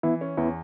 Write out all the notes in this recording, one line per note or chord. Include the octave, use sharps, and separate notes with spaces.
E3 B3 E4
C#4
E2 B3 E4